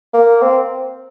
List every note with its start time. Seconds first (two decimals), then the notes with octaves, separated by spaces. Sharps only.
0.14 A#3
0.42 C4